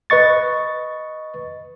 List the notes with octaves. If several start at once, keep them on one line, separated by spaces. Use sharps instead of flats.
B4 D#5 C#6 A6